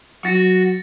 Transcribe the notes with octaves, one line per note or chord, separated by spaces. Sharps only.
F#3 F#4 A6 A#6 C#7